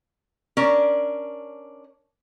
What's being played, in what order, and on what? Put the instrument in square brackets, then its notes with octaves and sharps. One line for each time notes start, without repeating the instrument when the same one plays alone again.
[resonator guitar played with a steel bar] C#4 D4 A#4 D5